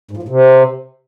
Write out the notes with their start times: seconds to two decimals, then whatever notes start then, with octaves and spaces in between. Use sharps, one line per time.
0.11 G#2
0.17 F3
0.23 A2
0.28 C3